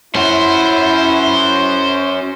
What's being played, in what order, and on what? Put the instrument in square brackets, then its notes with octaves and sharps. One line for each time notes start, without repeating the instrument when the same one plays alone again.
[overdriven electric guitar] C#4 F#4 [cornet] E4 [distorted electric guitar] C5